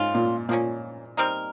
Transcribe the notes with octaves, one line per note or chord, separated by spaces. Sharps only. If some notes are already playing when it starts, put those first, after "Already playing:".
Already playing: G#2 A#3 C#4 F4
A#2
A#2 F3 A#3 C#4
G3 C4 D#4 A#4